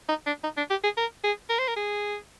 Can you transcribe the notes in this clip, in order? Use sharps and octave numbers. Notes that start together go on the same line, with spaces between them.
D#4
D4
D#4
D4
G4
G#4
A#4
G#4
A#4
C5
A#4
G#4